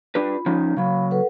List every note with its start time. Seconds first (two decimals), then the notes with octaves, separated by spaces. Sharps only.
0.15 D4 F4 G4 B4 B5
0.46 F3 C#4 D#4
0.77 C#3 F#3 F5 B5
1.11 A4 B4 F#5